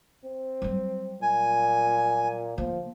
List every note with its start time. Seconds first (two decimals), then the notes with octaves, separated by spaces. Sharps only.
0.25 C4
0.62 F#3 G3
1.22 A#2 G#5
2.58 D3 F3 A#3